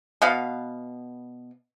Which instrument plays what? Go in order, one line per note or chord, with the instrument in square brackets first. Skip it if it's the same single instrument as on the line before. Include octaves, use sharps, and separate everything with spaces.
[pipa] B2 B3 F5